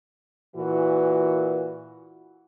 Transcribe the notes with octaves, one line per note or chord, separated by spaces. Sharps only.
A#2 E3 F#4